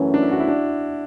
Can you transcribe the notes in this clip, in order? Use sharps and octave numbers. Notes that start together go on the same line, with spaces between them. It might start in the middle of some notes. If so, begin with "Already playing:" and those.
Already playing: F#2 E3 A3 C#4
D4
E4
F#4
E4
D4